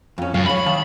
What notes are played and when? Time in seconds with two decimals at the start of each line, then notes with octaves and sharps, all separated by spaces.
0.18 F2 C#4
0.34 F#2 F5
0.46 C#5 F5 B5
0.66 D#3 F5 A5